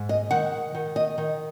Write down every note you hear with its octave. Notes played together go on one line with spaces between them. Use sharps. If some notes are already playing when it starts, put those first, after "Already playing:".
Already playing: G#2
D#5
D#3 F#5
D#3
D#5
D#3